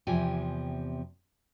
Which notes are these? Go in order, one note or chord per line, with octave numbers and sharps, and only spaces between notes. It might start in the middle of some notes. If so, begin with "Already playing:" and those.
E2 C3 F3 G4 G#5